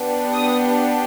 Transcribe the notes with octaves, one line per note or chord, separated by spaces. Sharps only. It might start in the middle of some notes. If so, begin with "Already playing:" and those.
Already playing: B3 D4 G4
D#6